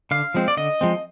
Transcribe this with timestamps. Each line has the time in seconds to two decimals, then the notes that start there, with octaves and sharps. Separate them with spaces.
0.11 D3 F5
0.34 F3 G#3 C4
0.48 D5
0.57 D3 D#5
0.81 F3 G#3 C4